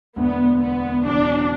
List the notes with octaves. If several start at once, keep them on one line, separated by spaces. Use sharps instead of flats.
E1 D2 D3 B3
B3
F#1 E2 B2 F#3 C4 D4